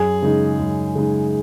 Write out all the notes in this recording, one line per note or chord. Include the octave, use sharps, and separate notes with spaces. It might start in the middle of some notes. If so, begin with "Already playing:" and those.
Already playing: F#2 G#4
C#3 G#3 D#4
F#2
C#3 G#3 D#4